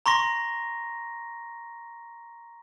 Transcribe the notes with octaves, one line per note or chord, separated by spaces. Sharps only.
A#5 C6 C#6 A#6